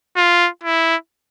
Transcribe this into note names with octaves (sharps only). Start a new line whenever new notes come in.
F4
E4